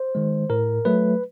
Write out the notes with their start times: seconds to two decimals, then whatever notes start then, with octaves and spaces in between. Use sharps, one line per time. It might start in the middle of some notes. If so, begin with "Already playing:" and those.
Already playing: C5
0.15 D#3 G#3
0.50 A2 A#4
0.85 F#3 A3 B4